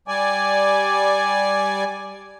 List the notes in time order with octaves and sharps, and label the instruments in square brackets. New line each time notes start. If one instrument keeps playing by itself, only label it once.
[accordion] G3 D5 G#5